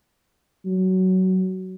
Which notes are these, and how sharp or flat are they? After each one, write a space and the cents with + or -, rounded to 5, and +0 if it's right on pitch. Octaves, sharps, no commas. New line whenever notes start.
F#3 +15